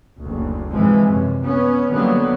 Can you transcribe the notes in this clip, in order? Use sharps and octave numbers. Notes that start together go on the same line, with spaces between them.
F#1 D2
G#2 C3 E3 F3 G#3
F#2 C3
B3 C#4
D3 F#3 G3 A#3 B3